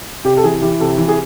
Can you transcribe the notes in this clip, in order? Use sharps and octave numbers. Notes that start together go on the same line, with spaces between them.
C3 G4
A4
E3 G#4
E3 G4
C3 A4
E3
G#4